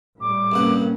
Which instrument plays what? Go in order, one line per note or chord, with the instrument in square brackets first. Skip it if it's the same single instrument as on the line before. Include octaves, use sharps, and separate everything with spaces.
[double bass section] A2 G3 [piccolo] D6
[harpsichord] C2 G2 F#5 [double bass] A#3 C#4